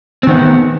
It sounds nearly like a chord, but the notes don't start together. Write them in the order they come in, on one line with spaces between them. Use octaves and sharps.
C4 D#3 B3